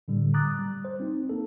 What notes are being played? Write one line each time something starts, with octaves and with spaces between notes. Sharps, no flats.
A2 D3 G3
A#5 D6 D#6 F#6 A6
G3
C5
C4 D#4
A#3 A4